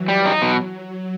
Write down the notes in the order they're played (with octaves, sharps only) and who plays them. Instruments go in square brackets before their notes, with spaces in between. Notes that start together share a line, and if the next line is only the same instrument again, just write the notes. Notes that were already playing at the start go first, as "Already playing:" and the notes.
Already playing: [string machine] E3 F#3
[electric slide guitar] G3
[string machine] F#3 [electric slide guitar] D#4
[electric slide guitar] B2